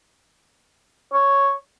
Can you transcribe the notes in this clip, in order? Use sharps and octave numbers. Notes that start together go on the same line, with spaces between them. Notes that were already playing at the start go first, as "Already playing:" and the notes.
C#5